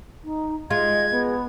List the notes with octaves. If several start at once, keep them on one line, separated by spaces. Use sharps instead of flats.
D#4
G#3 F4 D#5 G#6
B3